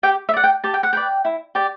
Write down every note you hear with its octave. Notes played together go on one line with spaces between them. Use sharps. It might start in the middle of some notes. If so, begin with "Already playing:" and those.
G4 G5
E5
D5 F#5
G5
G4 A5
G5
F#5
B4 D5 G5
E4
G4 D5